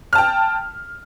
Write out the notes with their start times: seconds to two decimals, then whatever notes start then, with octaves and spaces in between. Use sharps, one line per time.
0.13 F6
0.15 A5
0.18 G5